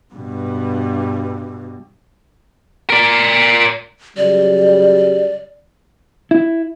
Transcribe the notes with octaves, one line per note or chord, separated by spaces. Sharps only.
G2 B2
A#4 D5
C#3 F#3 G3 D5
E4